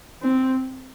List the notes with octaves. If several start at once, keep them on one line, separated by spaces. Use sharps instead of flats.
C4